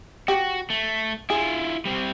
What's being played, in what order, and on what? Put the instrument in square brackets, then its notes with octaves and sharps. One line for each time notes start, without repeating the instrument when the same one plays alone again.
[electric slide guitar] F#4 [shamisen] G4
[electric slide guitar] A3
[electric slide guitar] E4 F4 [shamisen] G#4
[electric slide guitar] G3 C4